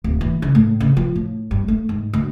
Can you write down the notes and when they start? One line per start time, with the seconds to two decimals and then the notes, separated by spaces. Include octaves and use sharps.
0.04 D1
0.21 E3
0.42 C#3
0.55 A2
0.80 C#3
0.97 F3
1.15 A2
1.51 G2
1.68 A3
1.89 G#2
2.13 D2